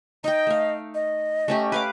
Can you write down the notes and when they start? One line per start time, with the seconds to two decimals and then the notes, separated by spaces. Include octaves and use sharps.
0.24 D#4 D#5 G5
0.47 A3 F5
0.95 D#5
1.48 A3 C#4 G4
1.72 B4 F5 D6